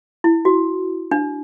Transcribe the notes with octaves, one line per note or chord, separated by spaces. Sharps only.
E4
F#4
D4